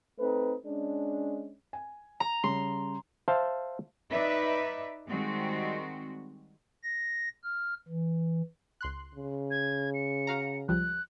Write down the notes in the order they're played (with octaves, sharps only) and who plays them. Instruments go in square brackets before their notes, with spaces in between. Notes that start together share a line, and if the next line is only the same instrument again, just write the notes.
[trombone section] A3 C4 D#4 B4
G#3 C#4 D4
[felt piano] G#5
[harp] A#5
[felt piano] C#3 G3 [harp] C6
[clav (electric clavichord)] C5 E5 F5 A5
[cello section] D#4 B4 D5 E5
D#3 G3 G#3 C4 F#4
[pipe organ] A#6
F6
E3
[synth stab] C#2 C6 F#6
[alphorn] C#3
[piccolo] G#6
C#7
[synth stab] F#4 F5 A#5
[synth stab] C#2 F3 G3 [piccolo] F#6